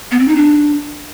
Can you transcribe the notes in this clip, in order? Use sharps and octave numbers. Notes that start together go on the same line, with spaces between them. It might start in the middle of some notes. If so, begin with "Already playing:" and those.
B3
C4
D#4
D4